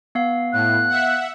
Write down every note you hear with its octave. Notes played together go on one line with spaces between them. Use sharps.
B3 F5
A2 F#6
E5 F#5